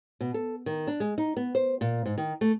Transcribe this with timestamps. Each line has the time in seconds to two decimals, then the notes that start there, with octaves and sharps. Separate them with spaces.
0.21 B2
0.34 A4
0.66 D#3
0.87 D4
1.00 G#3
1.18 D#4
1.37 B3
1.55 C5
1.81 A#2
2.05 G#2
2.18 D#3
2.41 A3